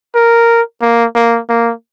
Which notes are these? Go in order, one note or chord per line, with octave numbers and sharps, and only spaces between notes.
A#4
A#3
A#3
A#3